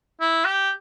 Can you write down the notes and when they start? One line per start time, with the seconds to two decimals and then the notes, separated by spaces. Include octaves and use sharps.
0.20 E4
0.45 G4